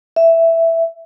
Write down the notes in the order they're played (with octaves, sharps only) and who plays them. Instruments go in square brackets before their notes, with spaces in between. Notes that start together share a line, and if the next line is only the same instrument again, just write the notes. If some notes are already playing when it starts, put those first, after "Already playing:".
[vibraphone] E5